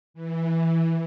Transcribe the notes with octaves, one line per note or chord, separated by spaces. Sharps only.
E3